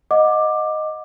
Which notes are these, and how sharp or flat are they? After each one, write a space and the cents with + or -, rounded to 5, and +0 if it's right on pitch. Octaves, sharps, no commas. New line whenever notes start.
D#5 +0 F#5 -25 D6 +10